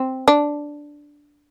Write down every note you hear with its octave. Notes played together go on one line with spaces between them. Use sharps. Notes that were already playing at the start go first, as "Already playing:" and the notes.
Already playing: C4
D4